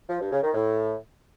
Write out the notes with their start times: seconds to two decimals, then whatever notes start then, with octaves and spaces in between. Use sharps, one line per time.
0.09 F3
0.21 G2
0.32 C#3
0.43 D#3
0.54 A2